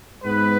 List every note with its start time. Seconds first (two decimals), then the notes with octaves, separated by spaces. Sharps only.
0.22 G#2 G#3 B3 B4